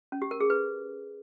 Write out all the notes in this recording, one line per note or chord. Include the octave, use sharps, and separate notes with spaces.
C#4
G4
A#4
G#4
B4